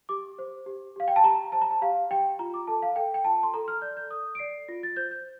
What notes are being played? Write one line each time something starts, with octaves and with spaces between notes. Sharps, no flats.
G4 D6
C5
G4
G4 F5
G5
A5
G4 A#5
C5 A5
A#5
A5
G4 F5
G4 G5
F4 A#5
D6
A4 A5
F5
A4 G5
G5
F4 A5
C6
A4 A#5
F6
D5 G6
G6
A4 D#6
D7
D5 C7
F4 A#6
A6
C5 G6
G6